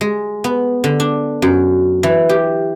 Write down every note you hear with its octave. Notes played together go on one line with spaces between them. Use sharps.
G#3
B3
D3
D4
F#2
E3
G4